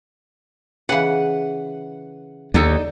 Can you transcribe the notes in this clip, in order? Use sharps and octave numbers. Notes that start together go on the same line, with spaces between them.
C#3 E3 B4 F#5
D#2 D3 D#4 A4